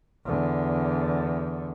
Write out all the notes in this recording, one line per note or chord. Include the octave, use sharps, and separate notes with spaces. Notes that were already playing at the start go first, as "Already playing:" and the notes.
E2 D3